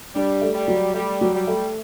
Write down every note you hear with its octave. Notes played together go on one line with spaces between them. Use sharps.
G3 D4
A3
G3
F#3
G3 A3
F#3
G3
A3